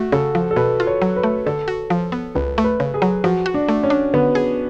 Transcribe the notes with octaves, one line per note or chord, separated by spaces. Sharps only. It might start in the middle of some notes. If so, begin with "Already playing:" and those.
Already playing: A3 F#4
C#3 A4
F3
A4
B2 B4
F4
C#5
F#3
B4
A3
D3 A4
F#4
F3
B3
C#2 B4
A3
B4
C#3
G#4
F#3
F3 F#4
F#4
D4
A3
C#4
D4
D3 B3
G#4